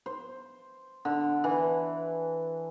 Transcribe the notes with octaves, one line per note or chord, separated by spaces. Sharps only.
C5
D3
E3